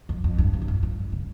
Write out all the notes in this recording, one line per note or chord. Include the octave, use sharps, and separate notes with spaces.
F2
F2
G2
F2
G#2
G2
G2
C#3